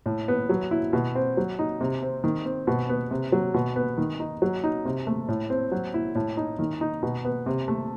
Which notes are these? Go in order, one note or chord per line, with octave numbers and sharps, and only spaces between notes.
A2
B3
F#3
E4
B2
C4
F#3
D#4
C3
C4
D#3
C4
B2
B3
C3
F#3
B2
B3
D#3
D#4
F#3
D#4
C3
A3
A2
C4
F#3
E4
A2
D#4
D#3
D#4
B2
B3
C3
A3